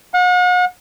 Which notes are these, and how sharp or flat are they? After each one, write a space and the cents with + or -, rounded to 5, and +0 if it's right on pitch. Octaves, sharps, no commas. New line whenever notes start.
F#5 -40